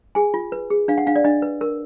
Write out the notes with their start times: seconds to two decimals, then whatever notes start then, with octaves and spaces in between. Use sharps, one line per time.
0.15 G#4 G#5
0.34 F4
0.52 B4
0.70 G#4
0.88 D4 F5
0.98 F#5
1.07 D4 F5
1.16 D5
1.24 D4 D#5
1.42 B4
1.61 A#4